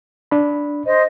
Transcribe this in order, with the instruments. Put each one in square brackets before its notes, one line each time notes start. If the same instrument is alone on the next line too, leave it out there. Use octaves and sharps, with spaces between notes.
[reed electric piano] D4 B5
[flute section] C5 D#5